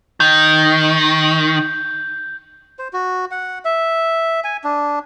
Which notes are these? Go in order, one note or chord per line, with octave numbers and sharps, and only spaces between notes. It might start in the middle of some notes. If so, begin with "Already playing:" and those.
D#3 G6
C5
F#4
F#5
E5
G#5
D4